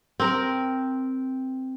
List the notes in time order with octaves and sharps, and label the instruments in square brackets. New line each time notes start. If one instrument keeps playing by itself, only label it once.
[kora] C4 A#4